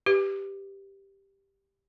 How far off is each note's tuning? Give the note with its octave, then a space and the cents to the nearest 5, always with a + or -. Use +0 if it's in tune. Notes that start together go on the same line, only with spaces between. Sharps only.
G4 +0 B4 +0